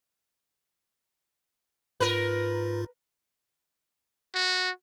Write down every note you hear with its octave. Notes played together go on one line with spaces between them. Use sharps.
G#2 F4 A#4 B4
F#4